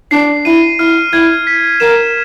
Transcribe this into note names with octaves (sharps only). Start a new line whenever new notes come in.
D4 C7
E4 D#7
E4 F6
E4 G#6
B6
A#4 E7